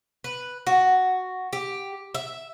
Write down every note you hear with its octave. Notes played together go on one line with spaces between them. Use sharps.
B4
F#4
G4
E5